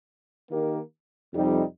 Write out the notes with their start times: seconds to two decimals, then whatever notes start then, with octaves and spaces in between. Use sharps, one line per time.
0.50 D#3 A#3 D#4 G4 A#4
1.33 F2 C3 G3 D#4